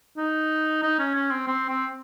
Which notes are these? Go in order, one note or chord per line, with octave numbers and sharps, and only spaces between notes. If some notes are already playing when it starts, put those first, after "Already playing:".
D#4
D#4
C#4
C#4
C4
C4
C4